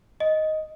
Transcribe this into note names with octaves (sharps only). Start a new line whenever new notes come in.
D#5